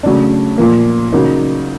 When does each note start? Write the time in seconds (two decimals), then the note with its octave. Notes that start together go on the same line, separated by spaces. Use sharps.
0.03 C#3 F#3 A3 D4
0.58 A#2 F3 A#3
1.12 C#3 F#3 A#3 D#4